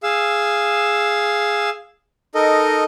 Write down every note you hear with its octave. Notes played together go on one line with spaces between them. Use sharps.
G#4 F5 E6
D#4 A4 A#4 D#5